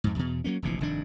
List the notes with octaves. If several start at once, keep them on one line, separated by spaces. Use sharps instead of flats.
F2 G#2
E2 B2
F#3 G3 A#3 C#4
F1 A#1 C3 E3
F1 G2 D#3 D4